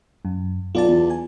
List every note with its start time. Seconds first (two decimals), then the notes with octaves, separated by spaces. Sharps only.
0.25 F#2
0.75 B1 F4 D5 A5
0.88 E2
1.10 G#5